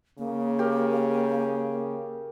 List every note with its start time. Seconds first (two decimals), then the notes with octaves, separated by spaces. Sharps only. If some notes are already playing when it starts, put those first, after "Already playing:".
0.18 C#3 A#3
0.59 G4 A#4